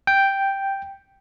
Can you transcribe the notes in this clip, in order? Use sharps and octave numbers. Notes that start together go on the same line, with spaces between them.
G5